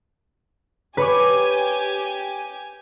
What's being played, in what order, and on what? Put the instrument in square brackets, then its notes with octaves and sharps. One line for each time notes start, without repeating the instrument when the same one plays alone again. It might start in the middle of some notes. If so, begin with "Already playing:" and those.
[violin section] G4 G#5 [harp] B4 C#5 D6